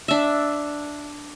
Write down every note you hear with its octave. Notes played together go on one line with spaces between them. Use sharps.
D4 E5